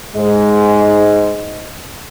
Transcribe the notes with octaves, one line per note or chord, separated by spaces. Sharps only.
G#2 G#3